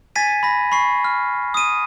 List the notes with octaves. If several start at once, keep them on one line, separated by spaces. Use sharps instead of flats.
G#5 G#6 A6 B6 D#7
B5 A#6
B5 C#6 C7
F6
D#6 D#7